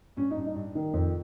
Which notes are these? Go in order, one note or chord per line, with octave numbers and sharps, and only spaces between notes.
G2 C#4
D#4
G2
D#4
G2
D#3
F2